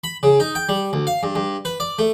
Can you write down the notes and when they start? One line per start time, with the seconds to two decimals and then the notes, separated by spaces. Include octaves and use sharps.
0.04 B5
0.23 C#3
0.40 D#4
0.55 G5
0.69 G3
0.93 D2
1.07 F5
1.23 G2
1.35 G2
1.65 B4
1.80 D5
1.99 A3